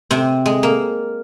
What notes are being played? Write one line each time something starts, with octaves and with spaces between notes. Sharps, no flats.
C3 C4
G#3
A#3